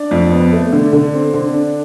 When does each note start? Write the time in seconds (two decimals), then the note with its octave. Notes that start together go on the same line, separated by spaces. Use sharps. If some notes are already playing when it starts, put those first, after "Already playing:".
Already playing: D4 D5
0.11 F2
0.31 B3
0.52 A3
0.72 D3
0.93 D3
1.14 C4
1.34 D3
1.54 D4